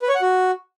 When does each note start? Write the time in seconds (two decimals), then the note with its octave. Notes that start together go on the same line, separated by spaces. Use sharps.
0.02 B4
0.09 C#5
0.15 F#5
0.22 F#4